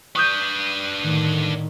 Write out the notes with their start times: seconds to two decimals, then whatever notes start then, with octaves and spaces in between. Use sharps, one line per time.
0.15 D4 B4 C#6 D#6 G6
1.01 A2 D3 D#3